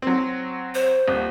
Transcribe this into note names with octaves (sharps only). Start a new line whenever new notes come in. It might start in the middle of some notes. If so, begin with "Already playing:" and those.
F#3 C4
C5
D#1